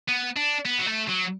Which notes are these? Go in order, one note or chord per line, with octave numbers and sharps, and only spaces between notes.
B3
D4
B3
F#3
A3
F#3